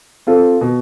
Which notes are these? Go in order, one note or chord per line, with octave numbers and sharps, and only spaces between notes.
C4 F4 A4
B2